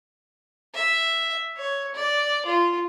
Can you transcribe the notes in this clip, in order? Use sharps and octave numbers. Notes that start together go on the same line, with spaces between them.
E5
C#5
D5
F4